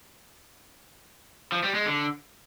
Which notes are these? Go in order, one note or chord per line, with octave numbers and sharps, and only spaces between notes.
F3
G3
G#3
D3